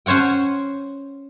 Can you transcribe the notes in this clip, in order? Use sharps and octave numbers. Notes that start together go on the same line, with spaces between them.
C#4 C5 C#5 F#5 G5